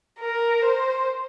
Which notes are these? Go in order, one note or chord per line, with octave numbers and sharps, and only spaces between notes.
A#4
C5